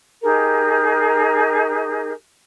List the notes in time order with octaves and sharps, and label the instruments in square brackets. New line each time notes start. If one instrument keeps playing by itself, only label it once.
[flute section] D#4 G4 G#4 A#4